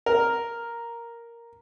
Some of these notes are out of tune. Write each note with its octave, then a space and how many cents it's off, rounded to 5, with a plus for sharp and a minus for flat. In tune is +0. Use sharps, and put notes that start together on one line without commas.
A#4 +0